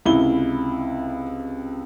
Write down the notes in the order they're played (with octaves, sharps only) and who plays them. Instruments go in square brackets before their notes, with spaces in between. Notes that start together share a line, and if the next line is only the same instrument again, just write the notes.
[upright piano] C#2 C3 G7 [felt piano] E4